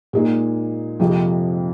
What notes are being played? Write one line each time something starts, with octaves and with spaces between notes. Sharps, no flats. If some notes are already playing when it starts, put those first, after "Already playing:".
A#2 G#3 D#4
F2 C3 F3 G#3